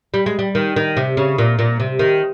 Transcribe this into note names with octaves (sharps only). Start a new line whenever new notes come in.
G3
G#3
G3
D#3
D#3
C3
C#3
A#2
A#2
C3
D#3